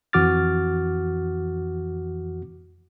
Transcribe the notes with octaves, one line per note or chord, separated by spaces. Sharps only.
F2 E3 F#4 D6 F6 A6